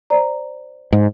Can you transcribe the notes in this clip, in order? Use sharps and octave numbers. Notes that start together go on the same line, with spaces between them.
C5 D5 A#5
G#2